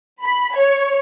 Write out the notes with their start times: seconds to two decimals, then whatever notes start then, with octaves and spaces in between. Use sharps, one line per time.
0.23 B5
0.57 C#5